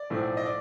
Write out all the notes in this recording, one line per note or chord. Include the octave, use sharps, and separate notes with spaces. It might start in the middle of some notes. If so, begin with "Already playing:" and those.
Already playing: D5
B1 A2 F3 A3
D#5
D5